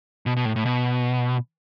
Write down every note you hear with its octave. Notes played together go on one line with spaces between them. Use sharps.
B2
B2
A2
A2
B2